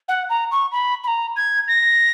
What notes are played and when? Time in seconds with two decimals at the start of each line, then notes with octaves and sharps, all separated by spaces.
0.08 F#5
0.29 A#5
0.51 C#6
0.72 B5
1.04 B5
1.07 A#5
1.36 G#6
1.68 A#6